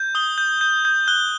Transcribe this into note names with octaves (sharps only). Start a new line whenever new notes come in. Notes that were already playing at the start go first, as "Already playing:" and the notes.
Already playing: G6
D#6 G7
G6
G6
G6
F#6 G7